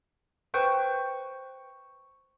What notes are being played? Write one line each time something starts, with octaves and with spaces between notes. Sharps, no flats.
B4 C5 G5 C#6